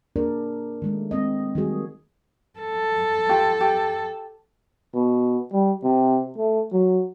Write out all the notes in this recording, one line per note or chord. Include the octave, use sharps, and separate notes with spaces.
A#3 D4 G#4 A#4 D5
D#3 G#3 A3
G#3 C4 D#5
D#3 F#3 G3 F#4 G#4
A4
F4 G4 F5
G4
B2
G3
C3
A3
F#3